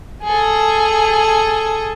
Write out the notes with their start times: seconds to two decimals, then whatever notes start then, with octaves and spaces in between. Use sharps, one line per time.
0.24 G#4 A4